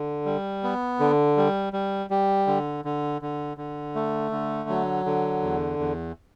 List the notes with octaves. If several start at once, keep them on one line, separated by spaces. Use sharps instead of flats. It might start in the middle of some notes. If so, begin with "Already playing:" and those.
Already playing: D3
G3
B3
D3
G3
G3
G3
D3
D3
D3
D3
A3
D3
F#3
D3
E2
E2